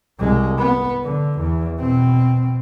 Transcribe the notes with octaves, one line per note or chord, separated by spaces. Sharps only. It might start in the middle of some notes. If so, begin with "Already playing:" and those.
C2 G#3
B3
D3
E2
B2 C4